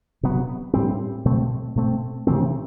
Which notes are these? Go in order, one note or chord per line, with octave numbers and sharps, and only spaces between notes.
C3 F#3 B3
A2 G3 C4
B2 F#3 A3 C4
B2 A3 C4
C3 E3 A3 C4